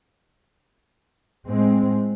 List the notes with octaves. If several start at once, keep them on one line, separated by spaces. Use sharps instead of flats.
A2 G#3 C4